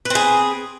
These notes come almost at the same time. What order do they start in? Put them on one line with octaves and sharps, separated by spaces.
B4 C4 G#4